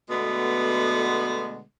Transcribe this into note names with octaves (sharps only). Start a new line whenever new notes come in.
B2 D3 G#3 A3 B3